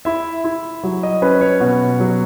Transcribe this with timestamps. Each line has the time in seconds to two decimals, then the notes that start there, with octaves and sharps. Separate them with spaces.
0.05 E4 E5
0.44 E4
0.83 F#3
1.03 D#5
1.22 C#4 B4
1.41 C#5
1.60 B2 F#4
2.00 F#3